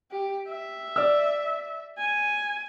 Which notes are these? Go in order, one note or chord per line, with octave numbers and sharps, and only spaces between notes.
G4
E5
D5 E6
G#5